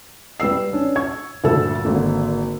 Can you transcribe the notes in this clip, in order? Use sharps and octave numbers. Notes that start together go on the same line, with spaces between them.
G3 B4 E6 C7
C#4 D4
C#6 G#6
D2 G2 A#2 A4 E6
G#1 D3 A#3